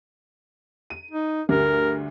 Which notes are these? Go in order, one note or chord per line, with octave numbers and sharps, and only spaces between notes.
D#7
D#4
D2 G2 A#4